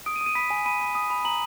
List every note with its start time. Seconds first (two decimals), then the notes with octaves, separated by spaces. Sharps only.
0.06 D#6 D7
0.16 D#7
0.21 D#6
0.26 D#7
0.35 B5 B6
0.50 G#5
0.66 B5 D#7
0.81 B5
0.95 D#6
1.10 B5
1.25 A#5 F#7